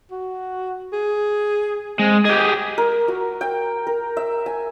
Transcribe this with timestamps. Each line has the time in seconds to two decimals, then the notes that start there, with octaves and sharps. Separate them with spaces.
0.11 F#4
0.93 G#4
1.99 G#3 C4
2.25 G4 G#4 D#5
2.78 A#4
3.08 F#4
3.41 G5
3.87 A#4
4.17 E5
4.46 G#5